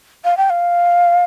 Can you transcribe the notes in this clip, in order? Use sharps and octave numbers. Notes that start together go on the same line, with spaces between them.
F5
G5
F5